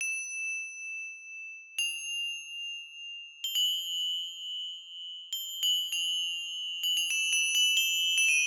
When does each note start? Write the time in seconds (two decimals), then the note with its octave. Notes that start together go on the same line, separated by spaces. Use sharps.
0.01 E7
1.79 F7
3.44 G7
3.55 F#7
5.33 G7
5.63 F#7
5.92 F7
6.83 F#7
6.97 F7
7.10 E7
7.33 E7
7.55 F#7
7.77 G7
8.18 E7
8.28 D#7